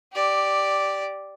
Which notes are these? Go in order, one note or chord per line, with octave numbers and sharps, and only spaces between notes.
G4 D5